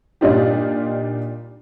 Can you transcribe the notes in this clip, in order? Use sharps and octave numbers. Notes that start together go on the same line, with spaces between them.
A#2 G3 D4 D#4 F4 G4